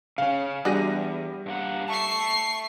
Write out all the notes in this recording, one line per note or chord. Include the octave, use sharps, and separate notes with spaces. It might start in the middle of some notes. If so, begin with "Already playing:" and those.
C#3 C#4 F5
E2 G3 D4 F#4 G#4 A#6 D#7
G2 A#3 F#5
E5 A5 C#6 C7